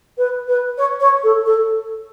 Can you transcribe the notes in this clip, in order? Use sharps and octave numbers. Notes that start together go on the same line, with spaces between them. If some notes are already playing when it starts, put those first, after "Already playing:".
B4
B4
C#5
C#5
A4
A4